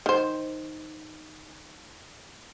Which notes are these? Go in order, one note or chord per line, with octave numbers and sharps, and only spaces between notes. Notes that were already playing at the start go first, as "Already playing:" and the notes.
D#3 C5